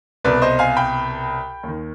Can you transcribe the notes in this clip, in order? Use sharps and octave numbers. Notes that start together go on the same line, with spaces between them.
C2 B2 B4 D5
C5 D#5
F5 G#5
G5 B5
D#2 D#3